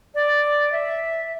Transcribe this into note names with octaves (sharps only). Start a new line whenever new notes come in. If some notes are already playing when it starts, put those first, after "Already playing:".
D5
E5